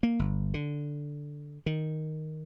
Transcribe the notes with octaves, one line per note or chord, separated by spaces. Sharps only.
A#3
G1
D3
D#3